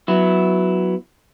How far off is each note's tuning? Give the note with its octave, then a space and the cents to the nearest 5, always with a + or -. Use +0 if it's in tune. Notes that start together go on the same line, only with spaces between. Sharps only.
F#3 -5 B3 +0 E4 +0